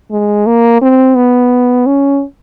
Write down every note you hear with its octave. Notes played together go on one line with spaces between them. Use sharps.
G#3
A#3
C4
B3
C#4